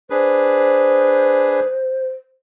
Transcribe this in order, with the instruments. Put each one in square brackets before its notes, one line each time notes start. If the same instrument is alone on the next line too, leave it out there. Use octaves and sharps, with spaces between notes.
[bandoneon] D4 G#4 B4 [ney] C5